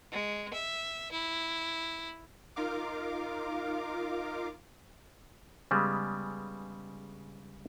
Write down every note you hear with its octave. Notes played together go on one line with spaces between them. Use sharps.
G#3
E5
E4
D#4 F4 A#4 F5 D6
C#3 G3 G#3 B3